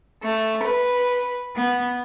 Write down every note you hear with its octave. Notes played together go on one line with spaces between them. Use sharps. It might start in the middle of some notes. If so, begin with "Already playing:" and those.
A3
B4
B3